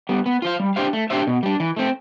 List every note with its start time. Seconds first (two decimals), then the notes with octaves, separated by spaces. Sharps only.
0.09 G3 B3
0.26 B3
0.42 F4 C5 F5
0.60 G3
0.76 D4 G4 C5 F5
0.93 A3
1.10 D4 G4 C5 E5
1.27 B2
1.43 G3 D4
1.60 E3
1.77 A3 C4